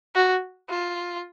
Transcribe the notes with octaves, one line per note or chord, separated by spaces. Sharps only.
F#4
F4